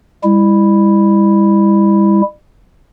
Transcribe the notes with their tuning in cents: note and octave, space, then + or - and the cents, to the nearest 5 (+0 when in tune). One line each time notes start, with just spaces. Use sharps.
G3 +40 E4 +0